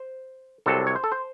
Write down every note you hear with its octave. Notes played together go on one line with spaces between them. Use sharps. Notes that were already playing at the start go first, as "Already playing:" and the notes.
Already playing: C5
C2 C3 F#3 A4
C#5
C5
A4
C5